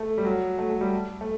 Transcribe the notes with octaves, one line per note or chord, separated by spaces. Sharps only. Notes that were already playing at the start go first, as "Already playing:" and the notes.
Already playing: A3
G3
F#3
A3
A3
G3
A3